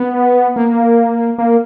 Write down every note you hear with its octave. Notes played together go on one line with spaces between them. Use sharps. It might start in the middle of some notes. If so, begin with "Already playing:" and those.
Already playing: B3
A#3
A#3